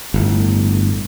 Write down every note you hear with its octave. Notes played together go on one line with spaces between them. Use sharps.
G1 A2